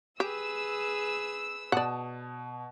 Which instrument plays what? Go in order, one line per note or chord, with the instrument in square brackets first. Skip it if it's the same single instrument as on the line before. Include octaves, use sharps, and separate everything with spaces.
[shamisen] G4 [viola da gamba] G#4 B4 [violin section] E6
[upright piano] B2 A5 D#6 [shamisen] D5 F#5